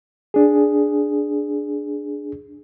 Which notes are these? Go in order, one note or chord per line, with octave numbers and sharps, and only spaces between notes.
D4 G#4